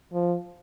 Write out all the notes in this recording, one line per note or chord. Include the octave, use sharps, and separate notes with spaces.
F3